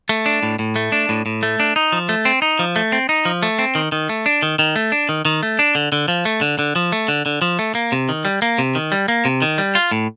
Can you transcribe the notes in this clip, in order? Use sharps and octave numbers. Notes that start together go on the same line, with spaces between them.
A3
D4
A2
A2
A3
D4
A2
A2
A3
D4
D#4
F3
A3
C4
D#4
F3
A3
C4
D#4
F3
A3
C4
D#3
D#3
A3
D4
D#3
D#3
A3
D4
D#3
D#3
A3
D4
D3
D3
F3
A3
D3
D3
F3
A3
D3
D3
F3
A3
A#3
C3
D#3
G3
A#3
C3
D#3
G3
A#3
C3
D#3
G3
F4
A2